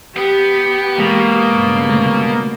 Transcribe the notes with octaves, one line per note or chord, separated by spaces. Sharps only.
B3 G4
B2 E3 G#3 A#3
G2 C#3
D3 G#3 A3